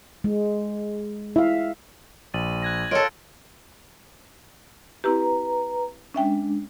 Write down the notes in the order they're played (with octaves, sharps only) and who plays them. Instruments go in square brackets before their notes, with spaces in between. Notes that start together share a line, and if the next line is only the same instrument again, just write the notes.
[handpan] G#3
[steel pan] E4 [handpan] E5 F5
[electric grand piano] A#1 [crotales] A6 D#7 F#7
[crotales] F#6 G#6 A#6
[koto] F4 A4 [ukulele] A#4 C#5 D#5 [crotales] D7 G7
[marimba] C4 E4 G4 [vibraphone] B4 A#5
[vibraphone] G#3 D4 [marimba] C#4 E5 G5